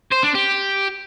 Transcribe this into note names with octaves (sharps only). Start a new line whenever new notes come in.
C5
D4
G4